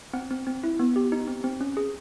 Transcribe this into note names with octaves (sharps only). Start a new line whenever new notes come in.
C4 F#5
C4
C4
E4
B3
G4
D#4
C4
C4
C#4
G#4